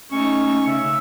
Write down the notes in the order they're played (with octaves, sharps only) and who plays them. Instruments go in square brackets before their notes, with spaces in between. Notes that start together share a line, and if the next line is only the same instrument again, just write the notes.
[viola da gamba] A3 D#4 [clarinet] C#4 [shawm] C#6
[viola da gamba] C#3 [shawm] E5